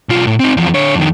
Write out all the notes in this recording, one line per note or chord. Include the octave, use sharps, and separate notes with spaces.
B1 F4
A2
C4 D#4
E2 F3
D3 C#5
F2 D#3